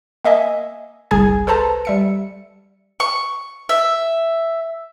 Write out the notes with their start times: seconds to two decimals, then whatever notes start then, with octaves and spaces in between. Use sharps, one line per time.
0.25 A#3 D#5 E5 G#5
1.11 G1 C2 G#4 G#5 G#6
1.47 A4 B4 C5 A5 A#5
1.85 G3 E5 C#7
3.00 C#6
3.69 E5